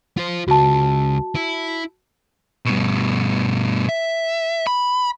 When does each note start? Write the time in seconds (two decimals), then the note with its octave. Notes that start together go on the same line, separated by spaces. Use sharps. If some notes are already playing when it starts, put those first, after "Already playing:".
0.17 F4 C5
0.48 C#2 F#4 A5
1.35 E4
2.65 G2 B2
3.89 E5
4.67 B5